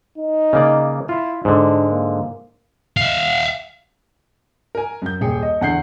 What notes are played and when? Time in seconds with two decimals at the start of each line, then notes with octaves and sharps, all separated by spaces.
0.18 D#4
0.53 C#3 A#3 D5
1.09 E4 F4
1.45 G#2 D3 D4
1.90 A#3
2.97 E5 F5
4.75 A#4 G#5
5.02 F#2 G6
5.21 D#1 G#4 G5 C#7
5.43 D#5
5.61 E2 D3 F#5 G6 C7